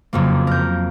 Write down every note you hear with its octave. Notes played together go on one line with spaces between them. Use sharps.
F#1 F2 A#3
A#4 G6